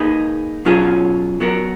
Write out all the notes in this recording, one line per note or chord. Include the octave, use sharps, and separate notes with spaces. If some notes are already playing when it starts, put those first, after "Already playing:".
Already playing: A#3 D#4 G#4 B4
B2 F#3 C#4 F4 G#4
F#3 B3 F#4 A#4